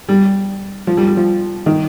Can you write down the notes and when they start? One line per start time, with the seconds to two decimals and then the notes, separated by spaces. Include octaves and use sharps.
0.09 G3
0.87 F3
0.97 G3
1.07 G3
1.17 F3
1.66 D#3